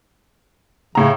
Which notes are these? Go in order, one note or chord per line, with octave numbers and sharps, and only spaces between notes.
A2 C#3 A#5